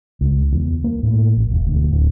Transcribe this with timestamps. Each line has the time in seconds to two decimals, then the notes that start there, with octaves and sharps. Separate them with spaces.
0.21 C#2
0.53 E2
0.84 A#3
1.03 A2
1.36 A1
1.52 E1
1.67 D2
1.90 D1